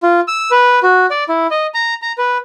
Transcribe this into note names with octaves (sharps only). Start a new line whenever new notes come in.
F4
E6
B4
F#4
D5
E4
D#5
A#5
A#5
B4